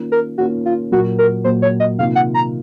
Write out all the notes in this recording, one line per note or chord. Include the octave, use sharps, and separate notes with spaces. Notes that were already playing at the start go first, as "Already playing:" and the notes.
Already playing: D#3 A#3 C#4 F4
A#4
D#3 A#3 C#4 F4 F#4
F4
A#2 F#3 A#3 F#4
A#4
A#2 F#3 A#3 C5
C#5
D#5
C3 D#3 A#3 F4 F5
F#5
A#5